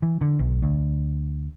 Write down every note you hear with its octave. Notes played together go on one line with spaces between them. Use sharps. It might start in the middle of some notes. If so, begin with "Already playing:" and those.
E3
D3
B1
D2